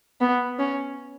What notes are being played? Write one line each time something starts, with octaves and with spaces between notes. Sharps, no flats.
B3
C#4